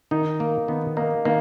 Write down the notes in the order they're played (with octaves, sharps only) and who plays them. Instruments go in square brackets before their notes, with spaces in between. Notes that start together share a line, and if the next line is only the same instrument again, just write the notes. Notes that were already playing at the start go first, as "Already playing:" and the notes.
[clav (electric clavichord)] D#3 [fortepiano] D#4
[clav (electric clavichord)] A#3
[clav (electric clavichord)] D#3 [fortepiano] B3
[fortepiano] A#3 [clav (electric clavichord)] D#4
[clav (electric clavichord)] D#3 [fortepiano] A#3